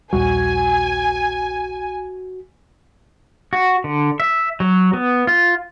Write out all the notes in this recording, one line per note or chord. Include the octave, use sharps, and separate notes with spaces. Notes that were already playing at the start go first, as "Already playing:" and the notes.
A#1 D#2 G3 F#4 G#5
F#4
D3
E5
F#3
B3
F4